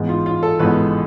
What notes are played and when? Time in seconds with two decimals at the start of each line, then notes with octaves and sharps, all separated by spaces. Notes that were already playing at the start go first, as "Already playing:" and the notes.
Already playing: A1 G#2 G#3 B3
0.09 F4
0.26 F4
0.43 A4
0.59 A1 G#2 G#3 B3 B4